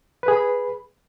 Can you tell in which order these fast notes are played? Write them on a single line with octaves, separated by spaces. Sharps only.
B4 G#4 B5